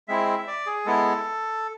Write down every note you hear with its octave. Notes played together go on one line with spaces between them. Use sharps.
G#3 C4 E4 E5
D5
G#4
G#3 B3 E4 A4